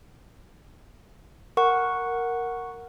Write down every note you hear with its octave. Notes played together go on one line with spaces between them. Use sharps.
A#4 F#5 C#6